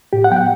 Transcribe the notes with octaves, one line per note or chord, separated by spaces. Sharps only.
A2 G4
F#5
F#3 B3 G5
F#5